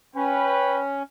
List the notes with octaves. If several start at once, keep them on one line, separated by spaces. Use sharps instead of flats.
C#4 B4 G5